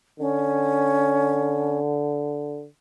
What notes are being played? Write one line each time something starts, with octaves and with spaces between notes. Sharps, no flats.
D3 C#4